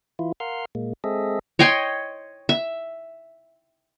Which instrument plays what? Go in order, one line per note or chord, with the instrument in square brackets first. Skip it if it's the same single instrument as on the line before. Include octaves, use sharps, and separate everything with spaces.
[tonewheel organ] E3 E4 F4
A#4 F5 F#5 C6 F6
A#2 G#3 A#3
G#3 C4 G#4 A4 D#5 E5
[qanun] C#5 D#5 G5 C6
E5